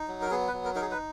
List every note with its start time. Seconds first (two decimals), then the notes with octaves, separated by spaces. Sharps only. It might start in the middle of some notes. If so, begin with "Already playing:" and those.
Already playing: D#4
0.08 F#3
0.22 A#4
0.31 B3 G#4
0.48 B4
0.53 F#3
0.65 A#4
0.75 D#4 A#4
0.81 G#4
0.91 B4